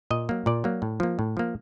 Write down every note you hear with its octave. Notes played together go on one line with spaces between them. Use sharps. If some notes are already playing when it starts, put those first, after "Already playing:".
A#2 D#5
F#3 A#3
A#2 D5
F#3 A#3
A2
F3 A#3
A2
F3 A#3